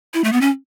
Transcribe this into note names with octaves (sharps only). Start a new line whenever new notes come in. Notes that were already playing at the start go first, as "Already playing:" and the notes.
E4
A3
B3
C#4